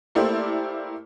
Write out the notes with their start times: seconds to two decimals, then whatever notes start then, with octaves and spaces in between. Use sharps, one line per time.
0.15 A3 A#3 E4 G4 C5 D5